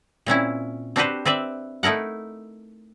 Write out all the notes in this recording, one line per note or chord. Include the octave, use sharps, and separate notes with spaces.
A#2 C4 C#4 E4
C4 D4 F#4 G4 B4 C5
C4 B4 D5 E5
A3 D#4 E4 A#4 F#5